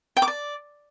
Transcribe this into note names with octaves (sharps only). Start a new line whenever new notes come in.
G5
D6
D5